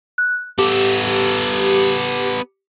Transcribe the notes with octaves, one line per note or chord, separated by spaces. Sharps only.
F#6
B3 G4 A4